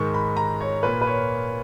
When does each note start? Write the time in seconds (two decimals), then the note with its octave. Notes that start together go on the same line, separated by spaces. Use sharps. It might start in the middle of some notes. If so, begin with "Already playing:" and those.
Already playing: G#2 D#3 G#3 C#6
0.14 B5
0.37 A#5
0.61 C#5
0.83 A#2 A#3 B4
1.01 B4
1.07 C#5